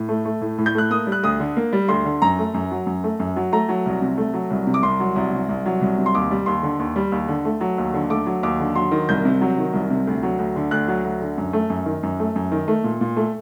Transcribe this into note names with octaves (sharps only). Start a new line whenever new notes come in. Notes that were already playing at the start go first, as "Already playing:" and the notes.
Already playing: A2
A3
A3
A2
A2
G6
A3 F#6
A#3 D#6
G3
F#6
D2 D#6
D3
A#3
G3
D2 C6
D3
F#2 A#5
A3
F#2
F#3
F#2
A3
F#2
F#3
A3 A#5
F#3
C2
C3
A3
F#3
C2
C3
D6
C2 C6
F#3
C2
C3
C2
F#3
C2
C3
C6
D#2 D6
G3
D#2 C6
D3
D#2
G3
D#2
D3
A3
F#3
D#2
D3
A3 D6
F#3
D#2 D6
D3
F#3 C6
D#3
C2 G6
C3
F#3
D#3
C2
C3
D2
F#3
D2
D3
D2 F#6
F#3
D2
D3
F#2
A3
F#2
D#3
F#2
A3
F#2
D#3
A3
A#2
A#2
A3